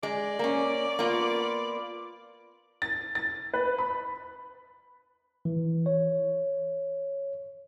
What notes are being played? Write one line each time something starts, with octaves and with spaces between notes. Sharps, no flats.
G#3 D5
A#3 C#4
A#3 B3 F4
A6
A6
B4
B5
E3
C#5